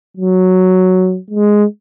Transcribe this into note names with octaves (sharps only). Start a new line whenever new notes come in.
F#3
G#3